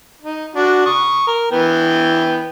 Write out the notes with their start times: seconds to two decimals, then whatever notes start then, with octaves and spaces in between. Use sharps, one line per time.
0.22 D#4
0.55 D4 F#4
0.86 C#6 D#6
1.27 A#4
1.52 E3 B3 G5